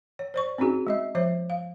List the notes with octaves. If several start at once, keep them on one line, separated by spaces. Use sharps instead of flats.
C#5
C5 D5 C#6
C4 C#4 D#4 F#4 G#4
G#3 D#5 E5
F3 C5 C#5 E5
F5